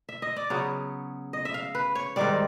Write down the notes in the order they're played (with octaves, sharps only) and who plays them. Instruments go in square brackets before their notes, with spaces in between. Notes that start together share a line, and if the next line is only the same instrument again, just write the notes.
[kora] E5
D#5
D5
C#3 F#3 B3 C#5
D#5
E5
F5
B4
C#5
G#2 D#3 G3 D5